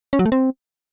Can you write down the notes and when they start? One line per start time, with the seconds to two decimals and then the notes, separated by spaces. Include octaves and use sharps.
0.13 C#4
0.19 F#3
0.26 A3
0.32 C4